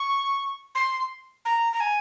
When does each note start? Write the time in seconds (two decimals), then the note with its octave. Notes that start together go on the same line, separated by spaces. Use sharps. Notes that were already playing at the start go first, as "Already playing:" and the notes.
Already playing: C#6
0.75 C6
1.45 A#5
1.73 A#5
1.80 G#5